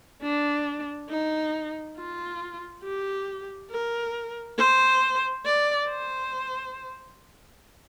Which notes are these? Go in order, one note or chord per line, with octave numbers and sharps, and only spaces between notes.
D4
D#4
F4
G4
A#4
C5
D5
C5